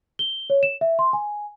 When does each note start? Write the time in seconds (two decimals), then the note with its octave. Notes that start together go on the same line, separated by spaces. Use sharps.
0.19 G7
0.50 C#5
0.63 E7
0.81 E5
0.99 C6
1.13 G#5